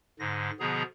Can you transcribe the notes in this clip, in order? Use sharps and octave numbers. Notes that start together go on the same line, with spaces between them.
G#2 D3 A#6
B2 D3 F3 B3 G#4 A#5